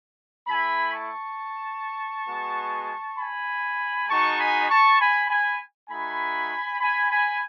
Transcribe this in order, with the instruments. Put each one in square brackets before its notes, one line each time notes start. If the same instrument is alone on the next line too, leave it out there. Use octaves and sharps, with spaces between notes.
[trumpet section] A3 E4 G#5 B5
A5 C#6
G#3 B3 F#4
G#5 B5
G#3 D#4 F#4 A5 C#6
G#5 B5
A5 C#6
G#5 B5
G#5 B5
A3 D#4 F#4 G#5 B5
G#5 B5
G#5 B5